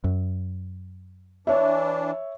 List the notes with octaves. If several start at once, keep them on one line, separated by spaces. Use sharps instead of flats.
F#2
E3 D4 C#5 E5